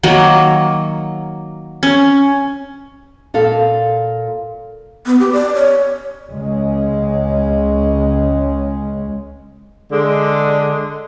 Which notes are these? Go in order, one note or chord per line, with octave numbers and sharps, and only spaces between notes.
D#3 F#3 A#3
C#4
A#2 A4 F5
B3
G4
D5
C#5
C#2 G#3 C#4
D3 G#3